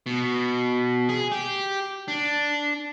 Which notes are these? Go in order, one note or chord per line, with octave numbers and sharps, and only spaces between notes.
B2
G#4
G4
D4